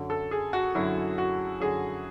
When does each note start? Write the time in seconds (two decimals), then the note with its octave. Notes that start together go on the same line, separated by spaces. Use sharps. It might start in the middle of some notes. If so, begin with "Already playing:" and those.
Already playing: F#2 D3 F#3
0.10 A4
0.31 G#4
0.53 F#4
0.75 F#2 D3 F#3 E4
1.18 F#4
1.60 F#2 D3 F#3 G#4